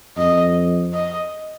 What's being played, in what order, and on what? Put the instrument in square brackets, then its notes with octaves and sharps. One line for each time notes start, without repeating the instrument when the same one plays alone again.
[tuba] F2 [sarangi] D#5
[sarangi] D#5